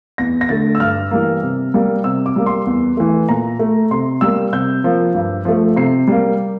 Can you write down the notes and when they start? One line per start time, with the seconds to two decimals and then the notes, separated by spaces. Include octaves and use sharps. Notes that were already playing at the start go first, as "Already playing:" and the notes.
0.18 E2 A#6
0.41 A#6
0.49 D3 A3 A6
0.75 E6
0.80 G2 F6
1.11 E3 G3 A#3
1.43 C3
1.74 G3 A#3
2.04 C3 E6
2.26 D6
2.36 G3 A#3
2.46 C6
2.67 E2
2.97 E3 A3
3.29 A#2 A#5
3.59 A3
3.91 C3 C6
4.21 G3 A#3 E6
4.53 C3 G6
4.84 F3 A#3
5.15 G2
5.45 F3 A3
5.76 C3 C7
6.08 G3 A#3